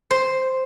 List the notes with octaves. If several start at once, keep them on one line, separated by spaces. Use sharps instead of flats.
C5